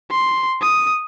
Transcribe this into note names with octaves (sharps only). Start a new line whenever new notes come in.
C6
D#6